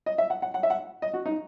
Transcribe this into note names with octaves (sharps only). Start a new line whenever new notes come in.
D#5
E5
F#5
F#5
F#5
E5
F#5
D#5
F#4
D#4